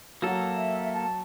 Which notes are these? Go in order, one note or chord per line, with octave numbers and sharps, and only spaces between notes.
F#3 A#3 F#4 A4
E5
A5